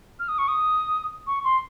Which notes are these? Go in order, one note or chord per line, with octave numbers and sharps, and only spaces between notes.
F6
D#6
C#6
D#6
C#6
C6